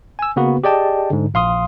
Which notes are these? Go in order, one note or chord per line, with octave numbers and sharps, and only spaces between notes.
G#5 E6
C#3 A#3 B3 F#4 B4
G4 G#4 D5 D#5 G5 A5
G#2 D3
A#1 F5 C6 D#6